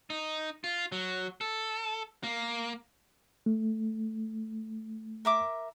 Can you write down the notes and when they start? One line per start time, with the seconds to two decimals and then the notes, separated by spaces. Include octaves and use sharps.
0.10 D#4
0.64 F4
0.92 F#3
1.41 A4
2.23 A#3
3.46 A3
5.25 A#4 E5 D6